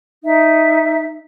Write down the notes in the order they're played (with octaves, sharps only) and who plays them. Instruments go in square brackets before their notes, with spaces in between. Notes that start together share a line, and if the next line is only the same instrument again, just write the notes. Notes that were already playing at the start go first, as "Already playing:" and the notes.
[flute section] D#4 E5